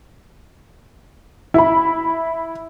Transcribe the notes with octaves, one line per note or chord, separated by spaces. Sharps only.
E4 B5